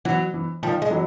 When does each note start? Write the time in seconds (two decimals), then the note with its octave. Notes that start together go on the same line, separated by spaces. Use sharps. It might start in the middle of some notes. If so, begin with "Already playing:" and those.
0.05 E3 F#3
0.34 E3
0.63 D#3 F3 G3
0.82 G#3
0.91 E3 F#3